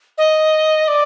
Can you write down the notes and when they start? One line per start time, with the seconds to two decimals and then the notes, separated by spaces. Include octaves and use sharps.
0.18 D#5
0.88 D5